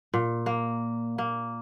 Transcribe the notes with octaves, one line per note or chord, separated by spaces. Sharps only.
A#2
A#3
A#3